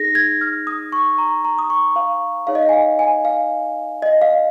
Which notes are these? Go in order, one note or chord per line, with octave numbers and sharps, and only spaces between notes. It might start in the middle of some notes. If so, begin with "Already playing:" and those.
Already playing: D#4 G#4 A#6
G#6
F6
D#6
C#6
A#5
A#5
D#6
C#6
F5
D#4 G#4 C#5 F5
D#5
F5
G#5
F5
G#5
F5
D#5
F5